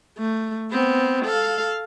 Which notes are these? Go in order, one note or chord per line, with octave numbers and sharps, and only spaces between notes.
A3
B3 C4
A4 F5